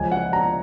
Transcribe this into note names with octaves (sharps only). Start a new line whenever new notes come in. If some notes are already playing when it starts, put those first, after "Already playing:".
Already playing: C#2 C#3 F3 G#5
F#5
A#5